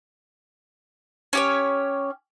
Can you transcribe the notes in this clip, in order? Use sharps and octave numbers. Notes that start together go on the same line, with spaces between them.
C#4 G4 C#5